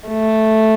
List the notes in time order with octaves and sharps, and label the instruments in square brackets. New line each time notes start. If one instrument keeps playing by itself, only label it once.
[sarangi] A3